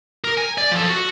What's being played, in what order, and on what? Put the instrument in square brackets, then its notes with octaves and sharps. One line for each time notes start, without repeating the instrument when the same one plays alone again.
[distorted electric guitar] A#4
G#5
D5
F3 A4
F#4